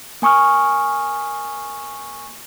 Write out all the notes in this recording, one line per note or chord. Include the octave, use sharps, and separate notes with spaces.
A#3 G#5 C#6 D#6 F6